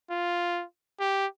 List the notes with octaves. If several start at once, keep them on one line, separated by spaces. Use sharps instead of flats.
F4
G4